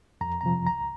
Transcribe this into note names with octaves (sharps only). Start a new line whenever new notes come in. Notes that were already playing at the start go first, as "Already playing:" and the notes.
F2 A#5
C3 F3 A#5
C#2 A#5